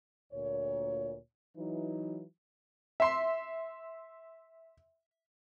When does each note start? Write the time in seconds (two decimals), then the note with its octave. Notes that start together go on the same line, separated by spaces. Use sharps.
0.33 D2 A#2 C#5
1.56 E3 F#3 D#4
3.00 E5 C6